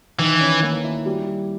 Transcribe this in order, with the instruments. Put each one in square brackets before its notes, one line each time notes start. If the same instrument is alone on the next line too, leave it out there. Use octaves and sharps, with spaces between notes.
[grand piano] D#3 [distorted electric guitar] E3
[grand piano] C#4
A#3
E4
G3